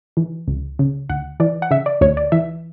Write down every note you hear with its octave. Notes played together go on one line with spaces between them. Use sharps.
E3
C#2
C#3
D2 F#5
E3 D5
F#5
C#3 E5
D5
D2 C#5
D5
E3 E5